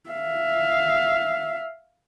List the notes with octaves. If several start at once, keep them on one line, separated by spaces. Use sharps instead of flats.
E5 F5